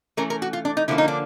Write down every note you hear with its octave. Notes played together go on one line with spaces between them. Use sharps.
E3 A3 C#4 A#4
A#4
F#4
F4
D4
D#4
D3 F3 A#3 C#4 E4
D#4
D4